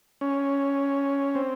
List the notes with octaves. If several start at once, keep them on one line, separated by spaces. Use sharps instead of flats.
C#4
C4